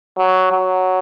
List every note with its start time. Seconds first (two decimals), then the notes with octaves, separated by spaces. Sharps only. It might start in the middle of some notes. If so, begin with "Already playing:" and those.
0.17 F#3
0.51 F#3